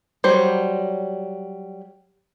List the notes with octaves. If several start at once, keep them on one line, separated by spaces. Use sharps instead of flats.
F#3 G3 C5